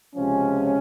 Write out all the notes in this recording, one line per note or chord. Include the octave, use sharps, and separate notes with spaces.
C#2 C3 F3 G#3 C#4